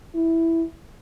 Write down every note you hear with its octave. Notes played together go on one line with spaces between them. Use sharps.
E4